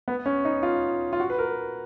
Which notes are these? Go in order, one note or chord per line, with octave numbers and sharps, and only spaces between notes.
B3
C#4
D#4
F4
F4
F#4
B4
A#4